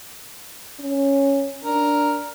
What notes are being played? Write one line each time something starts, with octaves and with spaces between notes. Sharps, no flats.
C#4
D4 A#4